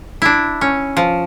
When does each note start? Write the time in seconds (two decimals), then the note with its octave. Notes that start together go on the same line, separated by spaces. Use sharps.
0.22 D4 E4
0.61 C#4
0.97 F3